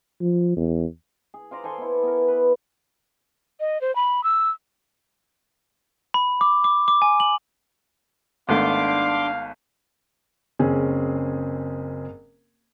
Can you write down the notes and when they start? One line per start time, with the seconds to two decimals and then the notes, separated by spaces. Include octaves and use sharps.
0.21 F3
0.56 E2
1.34 G#4
1.51 F4 C5 D5 A#5
1.64 A4 C5 G#5 C6
1.78 B3 E4
2.03 B3 A#4
2.28 B4
3.60 D#5
3.81 C5
3.96 B5
4.24 E6
6.14 B5
6.41 D6
6.64 D6
6.88 D6
7.02 G#5
7.20 F#7
8.49 G#1 A3 B3 D4 F5 C6 D6
10.59 F#1 C4 C#4 G#4